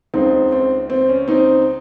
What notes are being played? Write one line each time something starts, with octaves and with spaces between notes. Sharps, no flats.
C#2 C#3 C4 D#4
C4
C4
C#4
C4 D#4